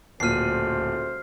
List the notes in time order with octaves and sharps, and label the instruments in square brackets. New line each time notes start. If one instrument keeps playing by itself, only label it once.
[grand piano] D1 A#2 D#7 [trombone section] C#2 A3 C5 [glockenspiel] F6 C7